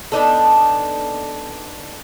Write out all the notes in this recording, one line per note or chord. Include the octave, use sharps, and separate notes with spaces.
B3 D4 D#4 A4